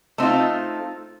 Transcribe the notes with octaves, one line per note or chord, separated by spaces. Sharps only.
A3 C4 D#4 F4